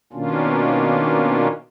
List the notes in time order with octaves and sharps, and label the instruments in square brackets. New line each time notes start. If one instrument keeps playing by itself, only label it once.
[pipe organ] B2 D#3 A#3 C#4 D4 F4